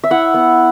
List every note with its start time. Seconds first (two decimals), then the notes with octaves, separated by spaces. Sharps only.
0.04 E5
0.10 E4 F#5
0.34 B3